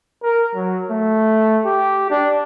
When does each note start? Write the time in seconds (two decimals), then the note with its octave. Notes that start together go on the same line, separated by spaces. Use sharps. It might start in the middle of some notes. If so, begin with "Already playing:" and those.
0.23 A#4
0.55 F#3
0.91 A3
1.65 G4
2.10 D4